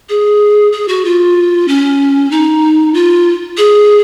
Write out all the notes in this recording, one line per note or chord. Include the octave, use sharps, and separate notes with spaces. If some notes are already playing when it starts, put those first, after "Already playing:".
G#4
G#4
F#4
F4
C#4
D#4
F4
G#4